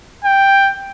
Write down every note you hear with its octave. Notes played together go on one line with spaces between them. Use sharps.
G5